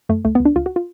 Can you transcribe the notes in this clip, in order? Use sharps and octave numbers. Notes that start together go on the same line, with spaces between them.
F#2 A3
C#2 A3
B3
C#2
D4
C#2 F4
F#4
F4